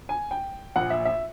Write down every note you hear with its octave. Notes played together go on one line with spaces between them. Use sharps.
G#5
G5
A#1 A#2 F#5
E5
E5